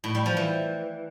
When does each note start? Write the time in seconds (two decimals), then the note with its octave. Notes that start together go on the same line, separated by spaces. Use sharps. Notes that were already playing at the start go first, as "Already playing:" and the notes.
0.04 A2
0.15 G3
0.26 F3
0.37 E3